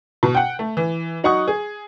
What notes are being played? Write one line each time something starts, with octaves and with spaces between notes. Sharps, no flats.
B2
F#5 G5
A3
E3
F#3 D#4 F#5 C#6 D#6
G#4